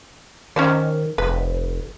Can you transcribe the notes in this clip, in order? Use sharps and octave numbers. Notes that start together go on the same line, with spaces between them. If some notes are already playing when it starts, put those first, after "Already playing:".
D#3 C#4 C5 D5
F1 B4